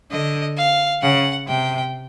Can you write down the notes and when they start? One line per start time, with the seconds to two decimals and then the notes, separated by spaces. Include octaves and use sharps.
0.11 D3 D#5
0.58 F5
1.02 C#3 F#5
1.47 C3 G5